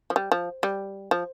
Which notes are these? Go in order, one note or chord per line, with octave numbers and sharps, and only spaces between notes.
F3
G3
F3
G3
F3